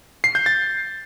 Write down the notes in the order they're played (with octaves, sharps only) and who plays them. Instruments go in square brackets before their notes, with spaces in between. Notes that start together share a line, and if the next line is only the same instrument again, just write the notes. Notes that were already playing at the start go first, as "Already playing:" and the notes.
[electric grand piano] C7
G6
A6